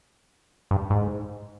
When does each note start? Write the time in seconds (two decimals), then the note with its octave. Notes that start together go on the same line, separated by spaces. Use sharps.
0.71 G2
0.90 G#2